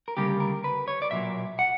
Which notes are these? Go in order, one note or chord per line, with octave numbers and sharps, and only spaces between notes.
A#4
D2 C#3 G3 A#3 G4
A#4
B4
C#5
D5
B1 A#2 F#3 A#3 E5
F#5